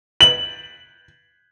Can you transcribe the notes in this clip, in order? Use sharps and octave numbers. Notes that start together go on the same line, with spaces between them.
F#7